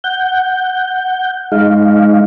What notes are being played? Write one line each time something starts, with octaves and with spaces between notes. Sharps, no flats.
F#5 G6
G#3 D#4 F5